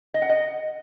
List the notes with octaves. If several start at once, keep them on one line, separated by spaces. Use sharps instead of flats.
D#5
F#5
D#5